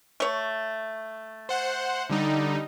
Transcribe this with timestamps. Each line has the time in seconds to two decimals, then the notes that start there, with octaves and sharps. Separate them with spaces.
0.20 A3 C#5
1.49 C5 F#5
2.10 D3 G3 D#4